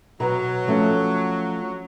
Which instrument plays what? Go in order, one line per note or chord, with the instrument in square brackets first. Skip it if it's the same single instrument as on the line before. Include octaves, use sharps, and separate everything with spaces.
[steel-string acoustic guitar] B2 A#5 [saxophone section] F#3
[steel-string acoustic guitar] F3 A3 C#4